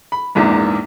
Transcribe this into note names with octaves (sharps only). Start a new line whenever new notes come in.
B5
A#1 E2 G#2 A#3